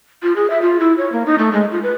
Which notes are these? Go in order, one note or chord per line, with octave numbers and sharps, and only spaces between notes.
F4
G#4
E5
F4
E4
C#5
A#3
D#4
A3
G#3
F4
B4